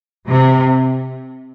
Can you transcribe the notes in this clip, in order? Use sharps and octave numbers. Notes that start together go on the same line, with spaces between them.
C3